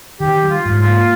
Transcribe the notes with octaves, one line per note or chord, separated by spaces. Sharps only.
D#3 G4
G3
F4
G#2
F4
A#3